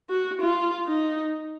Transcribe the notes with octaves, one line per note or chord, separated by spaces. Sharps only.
F#4
F4
D#4